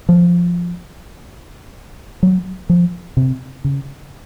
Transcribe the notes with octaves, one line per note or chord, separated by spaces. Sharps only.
F3
F#3
F3
C3
C#3